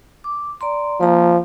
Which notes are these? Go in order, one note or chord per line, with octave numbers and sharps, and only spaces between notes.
D6
D5 A#5 C6
F3 A#3 A#5